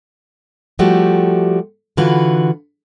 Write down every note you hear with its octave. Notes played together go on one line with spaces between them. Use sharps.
F3 G3 A3 F#4 G4
D3 E3 F4 F#4 B4